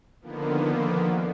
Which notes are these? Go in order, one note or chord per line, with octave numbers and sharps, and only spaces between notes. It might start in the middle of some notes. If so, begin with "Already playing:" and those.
D3 D#3 F3 A#3 B3